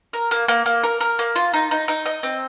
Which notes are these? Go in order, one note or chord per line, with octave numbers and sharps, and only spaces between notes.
A#4
A#3
A#3
A#3
A#4
A#4
A#3
F4
D#4
D#4
D#4
D#5
C4